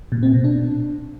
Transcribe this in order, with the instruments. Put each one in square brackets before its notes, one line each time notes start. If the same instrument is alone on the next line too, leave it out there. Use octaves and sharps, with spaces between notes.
[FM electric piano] A#2
C4
B2
D4